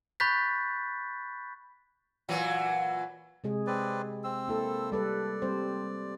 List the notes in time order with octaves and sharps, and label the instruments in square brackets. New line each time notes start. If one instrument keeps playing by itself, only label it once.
[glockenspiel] B5 C#6 F#6 G6 A6 B6
[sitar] A#2 E3 F#3
[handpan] C3 G#3 G#4
[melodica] C4 B4 D5
C4 E6
[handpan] A#3 E4 A4
[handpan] G3 A4 B4 [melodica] D5
[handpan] G3 C4 C5